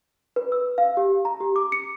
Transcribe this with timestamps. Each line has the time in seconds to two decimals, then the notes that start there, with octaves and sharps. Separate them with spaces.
0.36 B4
0.52 E6
0.78 F5
0.97 G4
1.25 A#5
1.40 G4
1.56 D6
1.72 C#7